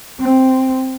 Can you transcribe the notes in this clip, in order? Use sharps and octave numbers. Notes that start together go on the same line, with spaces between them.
C4